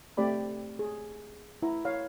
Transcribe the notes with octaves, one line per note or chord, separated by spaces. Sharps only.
A3 C4 G4 D5 B5
G#4
E4 A#5
C#5 F5